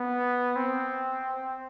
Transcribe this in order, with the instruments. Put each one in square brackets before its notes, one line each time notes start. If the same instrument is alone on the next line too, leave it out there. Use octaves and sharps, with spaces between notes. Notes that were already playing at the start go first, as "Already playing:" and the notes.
Already playing: [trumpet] B3
C4